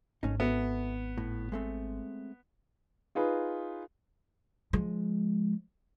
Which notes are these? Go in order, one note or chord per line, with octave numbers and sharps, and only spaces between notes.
G#1 A3 C#4 D#4
B3 F#4 A4 E5
A2
G#3 A3 C4
D#4 F4 G#4 B4
F3 G#3